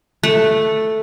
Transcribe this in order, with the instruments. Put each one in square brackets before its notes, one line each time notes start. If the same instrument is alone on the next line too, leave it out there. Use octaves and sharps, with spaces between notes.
[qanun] A3